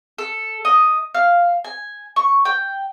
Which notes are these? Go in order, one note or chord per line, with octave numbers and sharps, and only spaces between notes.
A4
D#5
F5
G#5
C#6
G5